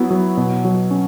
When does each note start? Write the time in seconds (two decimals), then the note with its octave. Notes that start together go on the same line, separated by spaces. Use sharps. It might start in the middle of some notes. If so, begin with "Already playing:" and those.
Already playing: F#3 B3 E4
0.10 F#3
0.37 B2
0.65 F#3
0.91 C#4